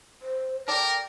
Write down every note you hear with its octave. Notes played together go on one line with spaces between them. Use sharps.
C5
A4 A#4 D5 G5